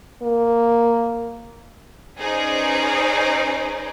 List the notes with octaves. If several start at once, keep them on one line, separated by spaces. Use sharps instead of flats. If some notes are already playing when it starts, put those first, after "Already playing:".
A#3
C#4 D#4 G#4 B4 C5 D5